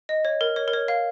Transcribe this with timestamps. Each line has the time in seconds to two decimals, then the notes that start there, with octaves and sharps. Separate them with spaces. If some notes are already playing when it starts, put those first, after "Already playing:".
0.09 D#5
0.25 C#5
0.41 A#4
0.56 C#5
0.68 A#4
0.73 C#5
0.88 F5